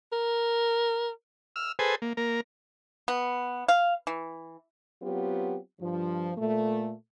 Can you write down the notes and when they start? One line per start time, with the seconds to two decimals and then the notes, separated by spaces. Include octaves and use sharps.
0.13 A#4
1.56 E6 F6
1.79 G#4 A4 B4 C5 G#5
2.02 A#3
2.17 A#3 A#4
3.08 B3
3.68 F5
4.07 E3
5.01 F#3 B3 C4 F4 G4
5.79 G2 F3
6.37 A#2 A3